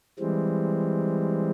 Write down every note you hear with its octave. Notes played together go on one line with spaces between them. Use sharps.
E3 G3 G#3 C4